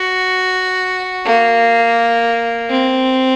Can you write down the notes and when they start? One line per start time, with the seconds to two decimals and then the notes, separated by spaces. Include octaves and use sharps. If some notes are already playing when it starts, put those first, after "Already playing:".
Already playing: F#4
1.26 A#3
2.70 C4